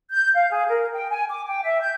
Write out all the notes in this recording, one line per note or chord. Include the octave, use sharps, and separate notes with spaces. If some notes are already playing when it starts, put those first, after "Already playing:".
G6
F5
G#4
A#4
G5
G#5
D6
G5
E5
G6